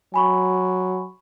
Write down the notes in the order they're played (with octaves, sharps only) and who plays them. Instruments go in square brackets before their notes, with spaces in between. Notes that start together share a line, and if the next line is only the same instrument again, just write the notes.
[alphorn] F#3 [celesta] G#5 B5 C#6